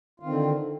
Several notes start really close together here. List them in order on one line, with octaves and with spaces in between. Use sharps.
F4 D#3 C4 D3